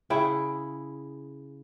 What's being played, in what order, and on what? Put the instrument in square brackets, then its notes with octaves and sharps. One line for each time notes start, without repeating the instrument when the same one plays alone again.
[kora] C#3 E4 G#4 G5